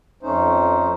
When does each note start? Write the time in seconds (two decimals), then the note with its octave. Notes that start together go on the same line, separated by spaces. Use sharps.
0.23 F2 A3 C#4 D#4 C5